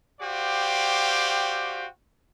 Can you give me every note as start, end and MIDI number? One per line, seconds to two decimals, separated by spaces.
0.21 1.87 66
0.21 1.87 67
0.21 1.87 72
0.21 1.87 74
0.21 1.87 77
0.21 1.87 79